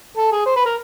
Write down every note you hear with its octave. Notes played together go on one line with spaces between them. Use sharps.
A4
G#4
C5
B4
A#4